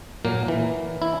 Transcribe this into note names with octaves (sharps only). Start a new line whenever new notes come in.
A#2 F#3 A#3
E3
E4